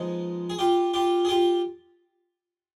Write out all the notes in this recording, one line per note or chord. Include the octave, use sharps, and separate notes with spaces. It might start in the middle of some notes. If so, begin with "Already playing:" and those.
Already playing: F3 G#3 B3 D#4
G#4
F4 G4
F4 G4
G#4
F4 G4